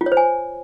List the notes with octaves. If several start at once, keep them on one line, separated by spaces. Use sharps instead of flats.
F4
C#5
C5
G#5